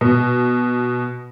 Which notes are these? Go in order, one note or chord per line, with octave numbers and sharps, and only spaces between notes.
B2